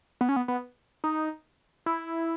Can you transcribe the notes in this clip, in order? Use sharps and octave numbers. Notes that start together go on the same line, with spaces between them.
B3
C#4
B3
B3
D#4
E4